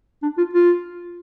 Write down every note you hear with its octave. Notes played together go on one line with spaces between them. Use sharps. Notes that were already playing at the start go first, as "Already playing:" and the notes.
D4
F4
F4